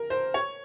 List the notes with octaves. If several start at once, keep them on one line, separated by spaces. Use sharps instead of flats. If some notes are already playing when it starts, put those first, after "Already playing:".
Already playing: A#4
C5
C#5